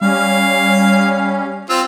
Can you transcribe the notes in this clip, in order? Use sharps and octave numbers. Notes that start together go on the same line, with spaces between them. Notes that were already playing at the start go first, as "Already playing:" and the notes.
G3 C#4 F5
C4 F4 E6